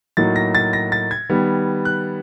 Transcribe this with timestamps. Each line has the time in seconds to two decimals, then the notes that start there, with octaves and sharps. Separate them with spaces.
0.17 A2 F#3 A#3 D#4 A6
0.36 A#6
0.55 A6
0.73 A#6
0.92 A6
1.11 G#6
1.29 D#3 G3 B3
1.85 F#6